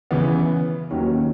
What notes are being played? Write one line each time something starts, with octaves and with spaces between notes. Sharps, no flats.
C#3 E3 B3
D#2 D#3 F#3 C#4